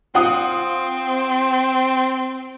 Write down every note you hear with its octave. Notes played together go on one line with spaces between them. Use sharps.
C4 F4 F#5 D#6